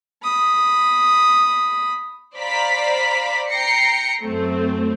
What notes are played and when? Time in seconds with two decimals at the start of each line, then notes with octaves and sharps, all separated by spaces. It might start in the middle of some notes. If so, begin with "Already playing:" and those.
0.24 B5 D#6
2.36 C5 D5 F5 A#5 B5 B6
3.51 G5 A#5 A#6 C7 C#7
4.21 F#2 A3 C4